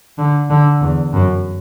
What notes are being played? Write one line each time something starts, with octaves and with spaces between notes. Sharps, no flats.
D3
D3
E2
F#2